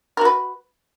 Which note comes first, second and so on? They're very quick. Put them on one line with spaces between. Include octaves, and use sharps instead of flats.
A#4 F#4 B4